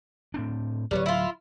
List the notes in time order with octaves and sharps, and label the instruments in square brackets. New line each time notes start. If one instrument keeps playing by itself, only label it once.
[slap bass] A2 C4 D4
[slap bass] D1 F#3 [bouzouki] G3 B3 C#5
[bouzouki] E4 F4